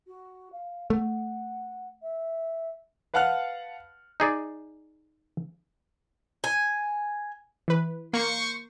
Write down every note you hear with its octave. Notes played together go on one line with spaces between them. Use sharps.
F#4
F5
A3 F#5
E5
B4 F5 F#5 A5 F6 F#6
D#4 G#4 D5
G#5
E3 B4
A#3 C5 C6 C#6